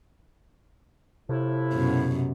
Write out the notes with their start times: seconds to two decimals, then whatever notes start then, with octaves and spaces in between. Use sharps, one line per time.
1.29 A2 C3 F3 E4
1.73 F#2 B2